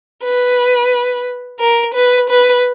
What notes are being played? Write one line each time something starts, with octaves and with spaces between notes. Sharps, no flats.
B4
A#4
B4
B4